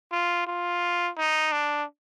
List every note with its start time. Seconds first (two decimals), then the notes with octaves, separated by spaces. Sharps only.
0.12 F4
0.47 F4
1.18 D#4
1.52 D4